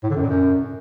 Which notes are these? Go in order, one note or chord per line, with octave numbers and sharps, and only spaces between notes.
A2
D3
F#2
A#2
F#2